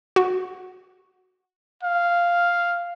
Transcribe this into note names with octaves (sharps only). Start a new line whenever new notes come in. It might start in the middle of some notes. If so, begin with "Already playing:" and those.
F#4
F5